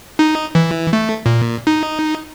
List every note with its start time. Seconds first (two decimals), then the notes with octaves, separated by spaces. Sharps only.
0.19 D#4
0.55 E3
0.93 A3
1.26 A#2
1.67 D#4